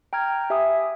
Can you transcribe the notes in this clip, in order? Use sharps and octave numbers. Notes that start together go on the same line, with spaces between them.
G5 A#5 F6 G#6
G4 E5 G#5 B5 D#6